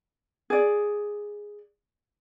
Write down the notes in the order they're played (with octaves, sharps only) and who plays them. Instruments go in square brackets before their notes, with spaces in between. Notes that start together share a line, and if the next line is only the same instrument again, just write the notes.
[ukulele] G#4 D5